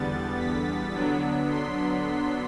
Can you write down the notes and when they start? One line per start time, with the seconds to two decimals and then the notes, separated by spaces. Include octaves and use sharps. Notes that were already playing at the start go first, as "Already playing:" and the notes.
Already playing: E2 D3 G3 B3 A6
0.37 B6
0.93 D3 F#3 B3 D4 B6
1.50 C6